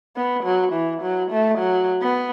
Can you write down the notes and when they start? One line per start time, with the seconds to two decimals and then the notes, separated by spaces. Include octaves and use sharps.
0.16 B3
0.44 F#3
0.73 E3
1.02 F#3
1.31 A3
1.58 F#3
2.02 B3